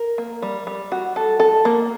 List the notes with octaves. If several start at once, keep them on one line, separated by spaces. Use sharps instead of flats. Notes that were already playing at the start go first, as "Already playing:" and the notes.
Already playing: A#4
A#3
G3
G3
F#4
A4
A4
A#3